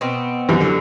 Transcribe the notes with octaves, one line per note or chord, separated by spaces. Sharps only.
B2 B3 C4
F#2 C3 E3
D3